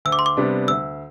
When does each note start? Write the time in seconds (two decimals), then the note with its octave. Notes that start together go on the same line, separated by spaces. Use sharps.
0.05 D2 E6
0.12 D6
0.19 C6
0.26 D6
0.37 C3 G3 B3 D4
0.68 D2 E6